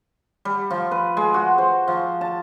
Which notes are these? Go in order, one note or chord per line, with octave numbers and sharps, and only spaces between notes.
G3
F3
B4
G#3
F#4
C5
F3
A5